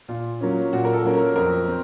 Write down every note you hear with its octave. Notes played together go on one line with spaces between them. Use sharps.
A#2 F4
F#3 A#3 C#4
A#2 F#4
A#4
A4
F#3 A#3 C#4
A#4
F2 A#4
C4